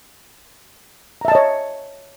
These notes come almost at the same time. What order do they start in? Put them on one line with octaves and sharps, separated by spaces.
A#5 E5 A5 D#5 C#5